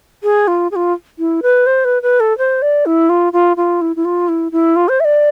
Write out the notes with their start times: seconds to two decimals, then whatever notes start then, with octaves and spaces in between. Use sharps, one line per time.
0.23 G#4
0.48 F4
0.71 G#4
0.76 F4
1.19 E4
1.43 B4
1.66 C5
1.85 B4
2.03 B4
2.20 A4
2.38 C5
2.62 D5
2.86 E4
3.09 F4
3.33 F4
3.57 F4
3.81 E4
3.96 E4
4.05 F4
4.28 E4
4.52 E4
4.76 F4
4.89 C5
5.00 E5
5.05 D5